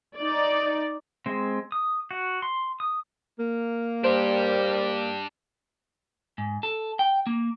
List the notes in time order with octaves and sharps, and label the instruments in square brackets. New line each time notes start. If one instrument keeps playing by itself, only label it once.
[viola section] D#4 D5
[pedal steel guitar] G#3 C4
D#6
F#4
C6
D#6
[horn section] A#3
[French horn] G3 [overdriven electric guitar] D4 G4 [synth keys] C5
[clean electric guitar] G#2
A4
G5
A#3